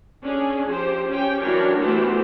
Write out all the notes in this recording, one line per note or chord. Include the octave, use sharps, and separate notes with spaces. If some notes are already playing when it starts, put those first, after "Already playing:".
C#4 D4 G#4
F3 G4 C5
C#4 G4 G5
E3 F#3 D4 A#4 C#5
E3 F#3 A3 B3 G4 C5